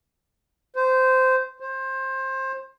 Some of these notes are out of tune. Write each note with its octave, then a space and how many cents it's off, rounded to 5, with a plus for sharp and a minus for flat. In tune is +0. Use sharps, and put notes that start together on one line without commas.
C5 -15
C5 +20